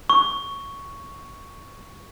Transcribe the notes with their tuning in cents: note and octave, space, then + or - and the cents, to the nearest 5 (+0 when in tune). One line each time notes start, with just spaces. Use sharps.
C#6 +5